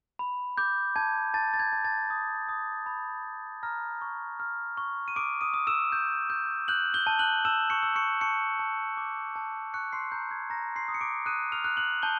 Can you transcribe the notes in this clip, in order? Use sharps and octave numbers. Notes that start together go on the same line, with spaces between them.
B5
D6 G6
A5 G#6
A5 A6
A6
G#6
A5
A5 A6
D#6
D#6
B5
B5
A#5 F6 A#6
C#6
F6
C#6
D#7
D6 D#6 D7
D#6 D#7
D#6
E6 E7
G6
G6
F#6 G6 F#7
G6 G7
A5
F#6 F#7
A5 E6 E7
C#6 C#7
E6
C#6 C#7
A5 C#6 C#7
A5
D6
A5
C#6 F#6 C#7
C6 C7
A#5 G6
G#6
A#5 A#6
C6 C7
D#6
C#7
D6 D7
D#6 F#6 D#7
F6 F7
F#6
F#6 F#7
A5 G6 G7